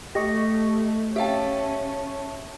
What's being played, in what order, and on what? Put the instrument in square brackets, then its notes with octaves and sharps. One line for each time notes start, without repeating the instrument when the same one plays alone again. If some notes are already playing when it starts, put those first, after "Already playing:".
[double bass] A3 [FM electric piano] G4 D#5 C#6 [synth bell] A#6
[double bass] C#4 [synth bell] G4 F5 G5 [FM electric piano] E5 A5